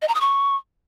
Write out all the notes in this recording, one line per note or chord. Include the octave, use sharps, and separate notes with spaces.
D#5
A#5
D#6
C#6